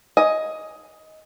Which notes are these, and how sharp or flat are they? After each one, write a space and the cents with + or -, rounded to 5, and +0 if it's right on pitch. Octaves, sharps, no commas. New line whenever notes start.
D#5 +10 G#5 +5